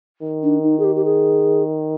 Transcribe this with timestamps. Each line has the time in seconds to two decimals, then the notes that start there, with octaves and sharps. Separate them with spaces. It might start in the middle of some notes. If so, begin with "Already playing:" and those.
0.22 D#3
0.43 D4
0.63 D#4
0.79 G#4
0.84 G4
0.95 G4
1.05 G#4